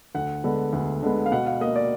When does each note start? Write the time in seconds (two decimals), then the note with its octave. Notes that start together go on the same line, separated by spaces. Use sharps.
0.15 D2 F#5
0.44 D3 G#3 B3
0.73 D2
1.02 D3 G#3 B3
1.26 F5
1.32 B2 F#5
1.46 F5
1.61 A#3 D#5
1.76 D5